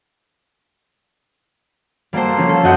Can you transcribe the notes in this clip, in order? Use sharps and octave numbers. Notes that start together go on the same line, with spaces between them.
G3 A#3 F#4 A4 C5
F3 C#4
A4
F#2 F#4 D#5 F#5 G6 C#7